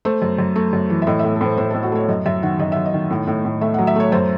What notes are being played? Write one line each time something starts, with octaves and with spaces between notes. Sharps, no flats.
A3 C5
F#2
F#2
A3
F#2
E3
E5
A2 D#5
A2 E5
A4
A2 C5
A2 C5
A2 A4
F#4
A3 C#5
F#2 D#5
F#2 E5
D#3 F#5
F#2 D#5
F#2 E5
D#5
D#3
A2
A2
A2
A3 E5
F#3 F#5
E5
A3 C#5
F#2 C5